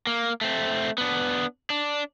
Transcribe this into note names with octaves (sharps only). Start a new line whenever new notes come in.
A#3
A3 C4
B3 D4
D4